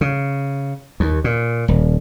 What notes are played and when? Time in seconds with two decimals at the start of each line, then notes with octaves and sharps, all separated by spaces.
0.01 C#3
1.00 D#2
1.24 A#2
1.68 D#1